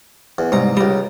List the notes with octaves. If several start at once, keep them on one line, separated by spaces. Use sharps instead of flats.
E2
C2 G#2 A#5
C#2 G3 A#5